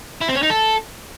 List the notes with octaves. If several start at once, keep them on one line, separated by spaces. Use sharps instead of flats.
E4
C4
C#4
D#4
A4